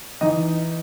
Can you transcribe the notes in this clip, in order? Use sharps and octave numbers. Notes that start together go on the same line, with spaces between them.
E3 D#4 D#5